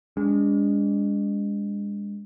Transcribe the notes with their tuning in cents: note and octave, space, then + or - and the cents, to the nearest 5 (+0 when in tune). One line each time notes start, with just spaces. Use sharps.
G#3 -30 D4 -40